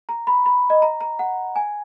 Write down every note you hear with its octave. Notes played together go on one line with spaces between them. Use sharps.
A#5
B5
B5
D#5
A#5
A#5
F#5
G#5